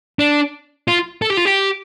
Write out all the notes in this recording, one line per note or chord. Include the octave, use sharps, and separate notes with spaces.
D4
F4
A4
G4
F4
G4